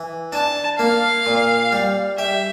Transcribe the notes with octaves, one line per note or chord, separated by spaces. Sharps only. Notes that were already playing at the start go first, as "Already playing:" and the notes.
Already playing: E3
D4 A5
A#3 F5
A#2
G3
G4 E5